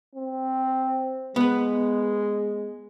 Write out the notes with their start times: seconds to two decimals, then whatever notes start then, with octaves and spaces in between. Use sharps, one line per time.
0.15 C4
1.36 G#3 B3 B4